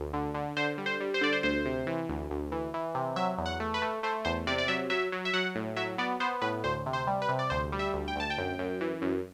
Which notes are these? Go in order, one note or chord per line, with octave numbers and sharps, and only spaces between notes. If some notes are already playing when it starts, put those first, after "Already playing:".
Already playing: D2
D3
D3
D3 C5
G3
C5
G3
C5
D3 D5
C5
D2 C5
C3
E3
D2
D2
E3
E3
C3
F#3 E5
E2
F#5
A3
B4
A3
A3 C5
E2 C5
C3 D5
D5
F#3 E5
F#3 E5
F#3
E5
F#3 F#5
A2
F#3 E5
B3 D5
B3 C5
A2 B4
D2 C5
C3
C5
G3
B4
C3
D5
D2 C5
G3
E5
D2
G5
D2 A5
G5
F#2
F#2
E3
F#2